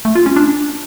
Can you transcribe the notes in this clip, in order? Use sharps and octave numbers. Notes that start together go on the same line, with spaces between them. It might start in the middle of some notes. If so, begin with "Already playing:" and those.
A3
F4
C#4
D4